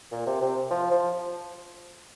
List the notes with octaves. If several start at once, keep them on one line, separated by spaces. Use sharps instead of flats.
A#2
C3
C3
F3
F3